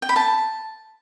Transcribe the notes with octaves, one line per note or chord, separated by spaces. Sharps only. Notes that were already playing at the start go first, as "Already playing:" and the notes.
G5
B5
A5